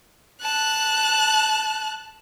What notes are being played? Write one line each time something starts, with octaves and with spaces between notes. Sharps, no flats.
A5 F#6